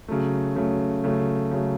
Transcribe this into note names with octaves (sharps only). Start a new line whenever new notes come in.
C#3 F#3 A3
C#3 F#3 A3
C#3 F#3 A3
C#3 F#3 A3